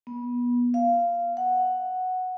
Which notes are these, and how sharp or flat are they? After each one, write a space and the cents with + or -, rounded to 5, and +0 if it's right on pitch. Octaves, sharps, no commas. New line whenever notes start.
B3 -25
F5 -10
F#5 +0